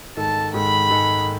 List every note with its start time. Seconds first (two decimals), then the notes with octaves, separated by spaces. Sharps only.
0.17 G#2 D#3 G#3 D#4 A4 A5
0.54 G#2 D#3 G#3 D#4 A4 B5
0.90 G#2 D#3 G#3 D#4 A4